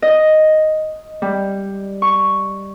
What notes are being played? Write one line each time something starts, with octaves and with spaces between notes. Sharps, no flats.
D#5
G3
C#6